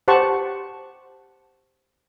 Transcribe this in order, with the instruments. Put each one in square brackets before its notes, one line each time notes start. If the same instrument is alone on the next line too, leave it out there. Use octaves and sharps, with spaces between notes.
[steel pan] G4 C5 F#5 A5 C#6